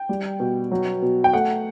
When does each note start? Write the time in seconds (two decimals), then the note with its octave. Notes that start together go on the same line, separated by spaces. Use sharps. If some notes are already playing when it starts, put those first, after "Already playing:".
Already playing: G5
0.09 G3
0.40 B2
0.71 F#3
1.02 B2
1.24 G5
1.33 A3 F#5